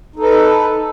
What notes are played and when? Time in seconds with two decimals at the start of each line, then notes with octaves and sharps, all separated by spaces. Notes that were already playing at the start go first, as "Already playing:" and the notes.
0.16 D#4
0.19 A4
0.23 B4